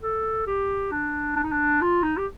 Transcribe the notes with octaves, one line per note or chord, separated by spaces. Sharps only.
A4
G4
D4
D4
D#4
D4
F4
D#4
G4